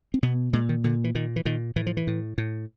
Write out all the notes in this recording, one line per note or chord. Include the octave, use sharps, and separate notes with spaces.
C4
B2 B3
A#2 G#3
D#3
A#2 D3
E3
A#2 D#3
E3
A#2 D#3
A2 E3
F3
E3
A2
A2